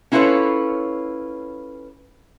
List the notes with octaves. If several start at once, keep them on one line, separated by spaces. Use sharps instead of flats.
C#4 E4 F4 A4 B4 C#5